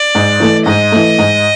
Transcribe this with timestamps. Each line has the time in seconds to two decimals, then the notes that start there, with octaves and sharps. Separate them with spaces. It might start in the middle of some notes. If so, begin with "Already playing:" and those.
Already playing: D5
0.15 G#2
0.40 E3 A3
0.66 G#2 D#5
0.92 E3 A3
1.18 G#2